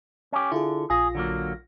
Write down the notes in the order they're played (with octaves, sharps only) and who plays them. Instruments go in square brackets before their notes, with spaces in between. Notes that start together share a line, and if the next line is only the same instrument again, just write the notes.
[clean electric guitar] C#4 G4
[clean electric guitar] D3 [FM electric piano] E4 F4 G#4
[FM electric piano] A#1 F4 A#6 [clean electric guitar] G#4
[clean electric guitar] D3 F#3 A#3